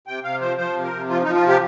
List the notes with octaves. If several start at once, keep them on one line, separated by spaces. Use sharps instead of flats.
C3 G5
C3 F5
F3 C5
F3 C5
C3
A#4
C3
F3 F4
F3 D#4
F4
C3 G4